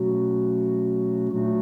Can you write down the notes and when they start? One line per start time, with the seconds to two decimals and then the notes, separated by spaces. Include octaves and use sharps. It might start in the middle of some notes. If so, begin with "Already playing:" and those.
Already playing: B2 F#3 A3 C#4 F#4
1.30 A#2 F#3 A3 D4 F#4